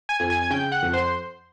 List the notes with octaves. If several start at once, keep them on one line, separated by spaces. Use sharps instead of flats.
G#5 G#6
F2
G#5 G#6
G#6
C#3 G5 G6
F#5 F#6
F2
C5 C6